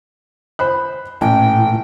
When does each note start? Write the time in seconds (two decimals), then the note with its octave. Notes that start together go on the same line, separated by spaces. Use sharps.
0.59 C5 B5 F#6
1.21 A1 A#2 A3 E4 G5